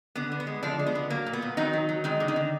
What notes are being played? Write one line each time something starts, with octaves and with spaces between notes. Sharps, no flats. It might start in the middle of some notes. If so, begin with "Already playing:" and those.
D3 B3
D3
B3
G#3
D3 F3 D4
G#3
B3
D3
F#3 A#3
A#2
B3
A#2
D#3 F#3 D#4
F#3
F#3
D#3 G#3 D#4
D3
D#3 D#4
D3